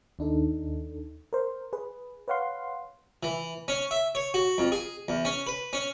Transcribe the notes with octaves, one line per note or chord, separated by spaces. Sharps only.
D#2 D4 D#4 A4
A#4 C5
G#4 B4
B4 C#5 F5 F#5 C6
E3
C#4
E5
C#5
F#4
F2
G#4
E2
C#4
B4
C#4